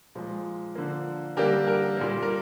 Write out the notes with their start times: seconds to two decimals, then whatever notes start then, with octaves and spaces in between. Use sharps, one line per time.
0.15 A#2 F3 G#3
0.75 D3 F3 A#3
1.37 D3 G3 A#3 G4 A#4
1.67 G4 A#4
1.97 A#2 G3 A#3
2.22 A#4